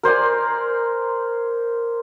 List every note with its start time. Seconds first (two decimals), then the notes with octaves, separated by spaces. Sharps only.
0.03 A#4 C5 D5 G#5